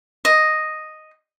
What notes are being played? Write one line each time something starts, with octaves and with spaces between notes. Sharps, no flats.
D#5